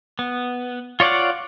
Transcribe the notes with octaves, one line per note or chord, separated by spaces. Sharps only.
B3
F4 C#5 D5 F5 F#5